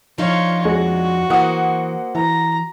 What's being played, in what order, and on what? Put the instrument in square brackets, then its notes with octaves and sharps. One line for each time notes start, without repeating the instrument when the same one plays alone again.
[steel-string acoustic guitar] F3 D4 D#4 [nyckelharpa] F4 C#5
[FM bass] F2 [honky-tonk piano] G#3 [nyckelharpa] F#4
[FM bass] E3 [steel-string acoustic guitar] A#3 C5 [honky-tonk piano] F#5 D#6
[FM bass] E3 [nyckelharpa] A#5